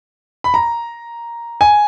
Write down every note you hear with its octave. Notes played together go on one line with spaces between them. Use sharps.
B5
A#5
G#5